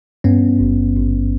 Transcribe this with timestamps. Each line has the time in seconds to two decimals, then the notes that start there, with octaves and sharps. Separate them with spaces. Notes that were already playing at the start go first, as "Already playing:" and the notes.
0.24 G2 B3 C#4
0.60 G#1
0.96 G#1